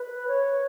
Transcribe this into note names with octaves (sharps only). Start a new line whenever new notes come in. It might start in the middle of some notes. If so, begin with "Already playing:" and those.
Already playing: B4
C#5